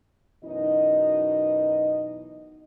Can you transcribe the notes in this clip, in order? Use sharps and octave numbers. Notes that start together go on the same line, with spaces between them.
F#2 B2 E3 D#4 D#5